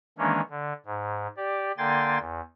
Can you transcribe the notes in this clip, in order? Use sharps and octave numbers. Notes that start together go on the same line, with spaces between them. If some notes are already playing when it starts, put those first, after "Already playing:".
D#3 E3 G#3 A#3 C#4 D4
D3
G#2
G4 D5
D3 A#3 G5 G#5 C6 A6
E2